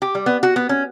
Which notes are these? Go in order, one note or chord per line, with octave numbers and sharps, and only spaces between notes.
G4
G3
B3
F#4
B3
C#4